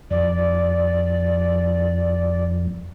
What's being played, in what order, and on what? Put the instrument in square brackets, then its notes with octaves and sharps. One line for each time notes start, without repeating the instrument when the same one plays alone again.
[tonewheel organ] F2 [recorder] D5